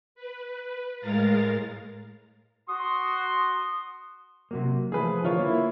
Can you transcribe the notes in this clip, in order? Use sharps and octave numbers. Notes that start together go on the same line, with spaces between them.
B4
A2 G#3 A#4 F5 A#5 A6
F#4 C6 D#6
C3 F#3 A#3
E3 F3 A3 G#4 B4
D3 E3 F4 A#4 C#5
A#3 E4